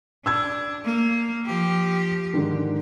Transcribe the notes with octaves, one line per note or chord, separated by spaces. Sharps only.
D4 E6 G#6
A#3
F3 G4
G#2 D3 D#3